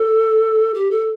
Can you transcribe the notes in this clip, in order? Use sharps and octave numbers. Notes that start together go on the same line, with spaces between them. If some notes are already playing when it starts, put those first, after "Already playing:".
Already playing: A4
G4
A4